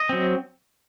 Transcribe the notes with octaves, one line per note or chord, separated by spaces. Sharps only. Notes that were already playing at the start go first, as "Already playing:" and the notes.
Already playing: D#5
F#3 C4